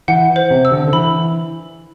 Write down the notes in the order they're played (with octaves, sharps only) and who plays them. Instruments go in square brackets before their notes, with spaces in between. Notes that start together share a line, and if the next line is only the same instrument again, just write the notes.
[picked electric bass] E3 [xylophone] F#5
[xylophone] C5
[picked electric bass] C3
[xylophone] E6
[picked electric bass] D3
D3
[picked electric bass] E3 [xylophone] B5